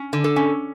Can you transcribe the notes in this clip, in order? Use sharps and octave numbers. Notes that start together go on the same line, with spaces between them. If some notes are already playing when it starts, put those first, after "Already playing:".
Already playing: C#4
D3
A4
C#4